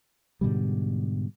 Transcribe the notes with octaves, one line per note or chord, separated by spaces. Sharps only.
G#2 B2 D3 G3